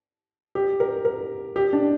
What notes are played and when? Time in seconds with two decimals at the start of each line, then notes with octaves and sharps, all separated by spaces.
0.55 G4
0.80 A#4
1.05 A#4
1.56 G4
1.73 D4